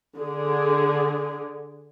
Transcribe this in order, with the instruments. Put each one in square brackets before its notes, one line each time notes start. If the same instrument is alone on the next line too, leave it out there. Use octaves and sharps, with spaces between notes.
[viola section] D3 G#4